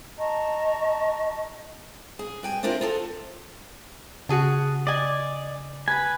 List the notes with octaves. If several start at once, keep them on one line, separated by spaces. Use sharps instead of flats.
D#5 A5 A#5 C#6
G#4
G2 G5 G#5
C4 D4 E4 F4 A#4 C5
F4 G#4 A4
C#3 F#4 G#4 A5
D5 D#5 G#5
B4 G#5 B5